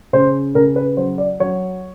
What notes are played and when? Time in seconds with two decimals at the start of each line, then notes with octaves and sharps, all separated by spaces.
0.13 C#3 C5
0.55 C#3 A#4
0.76 B4
0.97 F#3 C5
1.18 D5
1.40 F#3 C#5